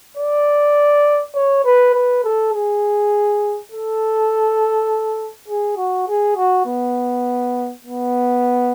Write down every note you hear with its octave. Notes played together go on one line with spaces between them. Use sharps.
D5
C#5
B4
B4
A4
G#4
A4
G#4
F#4
G#4
F#4
B3
B3